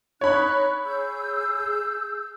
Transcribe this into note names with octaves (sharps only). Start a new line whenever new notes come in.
D#4 C#5 B5 F#6
G#4 E6 G6